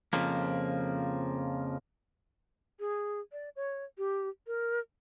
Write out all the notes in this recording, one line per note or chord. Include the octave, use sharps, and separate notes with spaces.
F2 C#3 F3 A#3
G#4
D5
C#5
G4
A#4